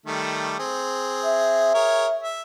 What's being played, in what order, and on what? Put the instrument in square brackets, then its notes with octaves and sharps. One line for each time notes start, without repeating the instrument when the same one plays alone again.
[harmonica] D#3 G3 A3
C4 G#4
[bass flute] E5
[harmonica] G#4 A#4 C#5
E5